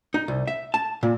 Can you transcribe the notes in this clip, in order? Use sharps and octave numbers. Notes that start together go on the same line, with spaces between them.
D#4
C2
E5
A5
A#2